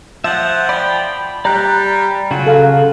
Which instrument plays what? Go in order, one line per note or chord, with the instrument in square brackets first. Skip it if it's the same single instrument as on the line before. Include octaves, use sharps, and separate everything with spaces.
[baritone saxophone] F3 [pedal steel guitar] E5 F#5
[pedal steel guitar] D5 G5 [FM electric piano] B5
[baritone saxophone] G3 [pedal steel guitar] D5 F#6 [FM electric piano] A#5
[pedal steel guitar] C#3 F4 F#4 [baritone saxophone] F#3
[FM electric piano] A4 F5